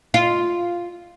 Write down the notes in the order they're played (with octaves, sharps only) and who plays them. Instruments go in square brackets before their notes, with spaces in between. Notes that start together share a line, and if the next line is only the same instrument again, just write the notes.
[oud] F4